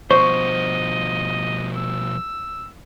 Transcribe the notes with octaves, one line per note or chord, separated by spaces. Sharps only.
B2 F3 C5 D#5 C6 C#6
E6